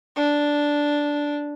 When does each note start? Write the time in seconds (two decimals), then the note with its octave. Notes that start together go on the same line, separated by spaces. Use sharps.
0.16 D4